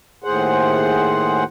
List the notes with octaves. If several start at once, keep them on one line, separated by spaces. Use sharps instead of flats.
D#2 A2 G#4 C5 F#5